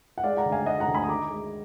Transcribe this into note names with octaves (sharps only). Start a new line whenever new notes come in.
F#5
G#3 D5 F5
F#5 A#5
D2
F5 G#5
G#3 D#5 F#5
F#5 A#5
D2
G#5 B5
D#6
D#3 A#5 D6
G#3